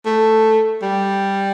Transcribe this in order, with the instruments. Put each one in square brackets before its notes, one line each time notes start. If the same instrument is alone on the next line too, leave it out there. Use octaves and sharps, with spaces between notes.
[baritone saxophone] A3
G3